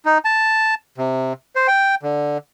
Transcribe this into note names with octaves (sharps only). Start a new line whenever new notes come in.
D#4
A5
C3
C5
G5
D3